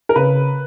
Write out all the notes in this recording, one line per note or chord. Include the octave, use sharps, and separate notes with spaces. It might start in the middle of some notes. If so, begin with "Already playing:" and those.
A#4
C#3 B4